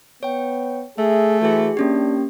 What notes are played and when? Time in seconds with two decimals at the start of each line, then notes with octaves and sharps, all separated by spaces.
0.23 B3 C#5 G5
0.98 A3 G#4 E5
1.42 E3 F#4 G#4
1.77 A#3 C#4 D4 G4